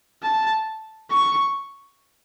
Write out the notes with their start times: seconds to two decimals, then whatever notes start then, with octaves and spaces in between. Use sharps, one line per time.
0.23 A5
1.11 C#6